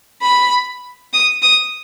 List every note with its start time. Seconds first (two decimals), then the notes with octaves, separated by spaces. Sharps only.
0.23 B5
1.13 D#6
1.42 D#6